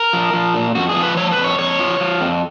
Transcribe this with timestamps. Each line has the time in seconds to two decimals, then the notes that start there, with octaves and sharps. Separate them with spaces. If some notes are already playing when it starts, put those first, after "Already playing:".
Already playing: A#4
0.13 F3
0.33 F3
0.54 A#2
0.75 F2 F#4
0.89 G#4
0.96 F3
1.03 B4
1.17 F3 C#5
1.31 B4
1.37 F2
1.44 C#5
1.59 F2 C#5
1.80 F3
2.00 F3
2.21 F2